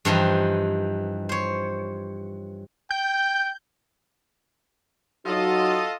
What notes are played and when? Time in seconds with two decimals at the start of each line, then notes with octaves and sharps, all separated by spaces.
0.05 G2 E3 F3 D#4
1.29 C5 C#5
2.91 G5 G6
5.26 F#3 D#4 F4 F#4 A4 D#5